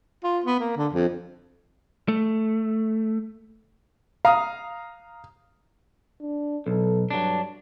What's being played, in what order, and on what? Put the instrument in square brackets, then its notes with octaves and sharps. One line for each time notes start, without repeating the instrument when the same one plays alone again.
[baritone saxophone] F4
B3
A#3
D3
F2
[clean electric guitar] A3
[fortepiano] F5 [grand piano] A#5 D#6
[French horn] D4
[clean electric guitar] B1 [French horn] A4
[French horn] G2 [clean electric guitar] F#3 D4